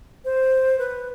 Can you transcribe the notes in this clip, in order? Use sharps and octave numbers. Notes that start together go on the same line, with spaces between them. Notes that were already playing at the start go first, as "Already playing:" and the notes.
C5
B4